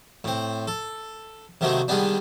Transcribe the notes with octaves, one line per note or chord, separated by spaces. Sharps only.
A2 C4
A4
C3 D#3 F#3 A3 A#3 C4
D3 D#3 G3 G#3 B3 D4